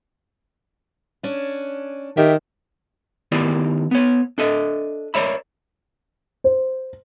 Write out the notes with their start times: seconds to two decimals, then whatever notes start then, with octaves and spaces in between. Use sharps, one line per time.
1.23 C#4 D4
2.17 D#3 G4 E5
3.32 D#3 B3 E4 G4 A#4 D5
3.91 B3 C#5
4.38 D4 A4 D#5 E5
5.14 A#4 B4 C#5 D5 E5 B5
6.44 C5